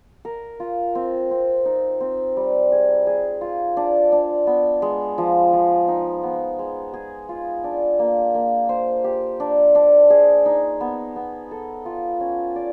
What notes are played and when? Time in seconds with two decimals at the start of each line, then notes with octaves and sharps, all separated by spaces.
0.25 A#4
0.60 F4
0.95 C4
1.31 C4
1.65 D#4
2.01 C4
2.37 G3
2.72 G#4
3.07 G#4
3.41 F4
3.77 D4
4.12 D4
4.47 B3
4.82 G#3
5.18 F3
5.53 F3
5.88 D#4
6.23 B3
6.59 G#3
6.93 G#4
7.29 F4
7.64 D4
7.99 A#3
8.35 A#3
8.69 C5
9.04 G4
9.40 D4
9.75 D4
10.10 G#4
10.46 D#4
10.81 B3
11.16 B3
11.51 A4
11.86 F4
12.20 C#4
12.56 D5